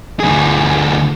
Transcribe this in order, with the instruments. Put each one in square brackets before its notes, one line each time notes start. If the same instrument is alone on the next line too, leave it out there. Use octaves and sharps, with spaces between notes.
[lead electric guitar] D2 G#4